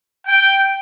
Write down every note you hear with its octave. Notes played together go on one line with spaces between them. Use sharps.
G5